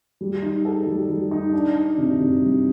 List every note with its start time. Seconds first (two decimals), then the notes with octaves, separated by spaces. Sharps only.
0.21 G3
0.42 D#4
0.65 A4
0.87 G3
1.09 G3
1.31 D#4
1.53 D4
1.75 D4
1.98 C3
2.19 C3
2.41 G3